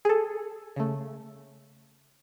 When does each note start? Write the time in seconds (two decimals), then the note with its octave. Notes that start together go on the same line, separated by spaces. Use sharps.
0.05 G#4 A4
0.76 C#3 A3